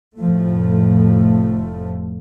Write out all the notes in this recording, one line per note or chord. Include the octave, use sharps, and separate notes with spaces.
F1 F2 A2 F3 A3